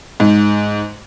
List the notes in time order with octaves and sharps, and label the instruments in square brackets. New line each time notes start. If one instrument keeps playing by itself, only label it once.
[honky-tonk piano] G#2